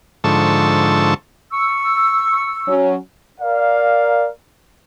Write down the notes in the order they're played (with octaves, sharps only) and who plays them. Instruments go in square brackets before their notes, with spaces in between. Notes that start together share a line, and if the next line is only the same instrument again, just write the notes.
[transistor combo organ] G#2 D3 F3 A4 A5 C#6
[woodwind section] C#6 E6
[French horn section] F#3 C#4
[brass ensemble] A#4 D5 F5